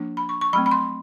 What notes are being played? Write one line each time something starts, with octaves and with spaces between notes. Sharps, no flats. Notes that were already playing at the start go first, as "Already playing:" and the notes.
Already playing: F3 A#3 D4
B5
C#6
C#6
F#3 A3 C4 B5
B5
C6